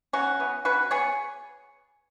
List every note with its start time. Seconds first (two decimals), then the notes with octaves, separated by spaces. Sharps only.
0.13 C#3 C#4 F#4
0.40 E3 B3
0.65 C#3 F#4 B4
0.91 B3 G#4 C#5